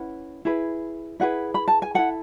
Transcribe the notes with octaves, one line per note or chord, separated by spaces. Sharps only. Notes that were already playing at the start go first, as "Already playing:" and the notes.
Already playing: C#4 E4 B4 F#5
E4 G#4 B4
E4 G#4 B4 F#5
B5
A5
G#5
E4 A4 F#5